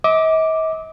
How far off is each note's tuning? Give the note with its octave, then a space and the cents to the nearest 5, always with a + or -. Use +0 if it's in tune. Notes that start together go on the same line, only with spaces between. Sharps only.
D#5 +45 D6 +0